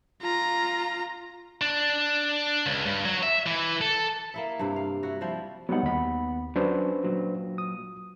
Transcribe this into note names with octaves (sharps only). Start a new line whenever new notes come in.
F4 A#5
D4
C#2
G2
F#3
E5
E3
A4
A#3 E4 E5
G2 C3
F5
E4 F#4
F3 G3 E4 C5
F#3 G3 B3 D#4 F#5
D#2 B5
F#3 C#4 D4 F#4 B4 C5
A#2 F#3
D#6